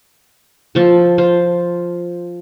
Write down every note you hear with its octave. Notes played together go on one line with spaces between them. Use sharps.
F3 A4
F4 C5